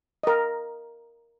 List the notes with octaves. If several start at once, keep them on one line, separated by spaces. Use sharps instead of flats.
A#4 D#5